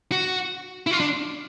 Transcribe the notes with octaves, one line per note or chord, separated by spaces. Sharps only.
F#4
E4
F4
D4